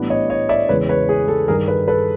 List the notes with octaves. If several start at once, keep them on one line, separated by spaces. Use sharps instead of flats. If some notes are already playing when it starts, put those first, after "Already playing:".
Already playing: A2 E3 G3 B3 D4
C#5 D#5
C#5 D#5
D5 E5
E2 C#3 E3 G#3 B4 C#5
B4 C#5
G#4
A4
G2 D#3 G3 G#4 A#4
A4 B4
A4 B4